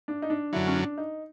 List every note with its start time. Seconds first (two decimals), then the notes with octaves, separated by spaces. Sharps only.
0.08 D4
0.22 D#4
0.30 D4
0.53 F#2 D3 F#3 E4
0.67 C#4
0.75 D4
0.98 D#4